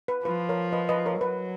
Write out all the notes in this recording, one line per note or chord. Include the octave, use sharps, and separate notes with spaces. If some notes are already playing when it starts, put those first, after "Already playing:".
B4
F3 B4
A#4 C#5
B4 D#5
B4 D#5
A#4 C#5
F#3 B4